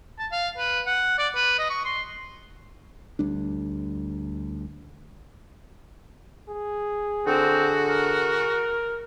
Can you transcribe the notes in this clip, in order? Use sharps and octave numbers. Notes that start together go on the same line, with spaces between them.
A5
F5
B4
F#5
D5
B4
D#5
C#6
C6
D2 G3 D4
G#4
D3 C4 F#4
A#4